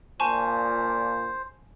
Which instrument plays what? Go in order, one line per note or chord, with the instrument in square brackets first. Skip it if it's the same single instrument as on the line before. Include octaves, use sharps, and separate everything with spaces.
[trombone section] A#2 D4 F4 [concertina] C5 [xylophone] G#5 A5 C#6